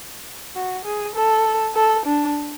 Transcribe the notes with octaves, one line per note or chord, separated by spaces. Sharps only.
F#4
G#4
A4
A4
D4